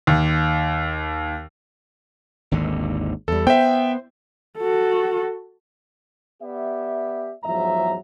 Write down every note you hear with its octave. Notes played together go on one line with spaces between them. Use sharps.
D#2
G#1 D#2 D3
E2 G3 A4
B3 C5 E5 G5
F#4 A4
B3 G4 D5 E5
E2 G#2 F3 F#3 E5 A#5